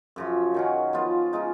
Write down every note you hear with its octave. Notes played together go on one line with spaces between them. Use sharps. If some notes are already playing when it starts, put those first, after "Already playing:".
F#2 C#3 F3
D#3 F#3 C#4
F3 B3 F4
C#3 F3 G#3 D#4